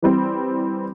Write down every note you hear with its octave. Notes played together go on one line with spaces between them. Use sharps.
E3 G3 C4